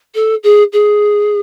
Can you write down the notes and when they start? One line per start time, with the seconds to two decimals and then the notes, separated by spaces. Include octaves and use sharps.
0.15 A4
0.43 G#4
0.72 G#4